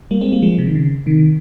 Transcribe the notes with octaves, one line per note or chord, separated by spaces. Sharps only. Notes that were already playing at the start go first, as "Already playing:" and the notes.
G3 A#3
G#3 C4
G3 A#3
F3 G#3
C3
D#3
C#3
C3 D#3